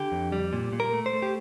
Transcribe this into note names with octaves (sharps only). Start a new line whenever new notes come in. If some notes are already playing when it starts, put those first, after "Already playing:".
Already playing: D3 G4
F2
G3
A#2
A#2
A#4
A3
C5
A3
G4